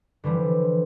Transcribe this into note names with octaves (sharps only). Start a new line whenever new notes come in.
D3 E3 F3 G3